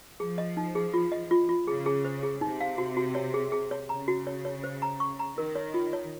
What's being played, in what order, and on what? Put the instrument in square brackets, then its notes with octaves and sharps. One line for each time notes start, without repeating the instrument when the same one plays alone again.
[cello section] F3 [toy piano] G#4
[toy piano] D#5
D#4
G#4
F4
D#5
F4
F4
[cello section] C#3 [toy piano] G#4
[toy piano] G#4
C5
G#4
[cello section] C3 [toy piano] D#4
[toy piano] F5
F#4
F#4
C#5
G#4
G#4
C#5
[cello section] C#3 [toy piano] A#5
[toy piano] F#4
C#5
C#5
C5
A#5
C#6
A#5
[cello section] D#3 [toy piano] A#4
[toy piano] C#5
F4
C#5